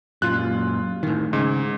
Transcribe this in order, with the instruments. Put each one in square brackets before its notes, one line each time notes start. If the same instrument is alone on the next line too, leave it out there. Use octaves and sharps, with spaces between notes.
[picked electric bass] F#2 A#2 [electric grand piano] F4 F#6
[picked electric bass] A2 D#3
[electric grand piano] G#2 [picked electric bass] C#3